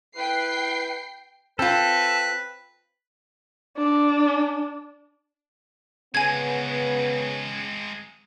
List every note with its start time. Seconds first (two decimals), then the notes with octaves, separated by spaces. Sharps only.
0.16 E4 B4 G5 C7
1.59 C4 F4 A4 B4
3.77 D4
6.15 C#3 G#3 B3 C4 G#5 G#6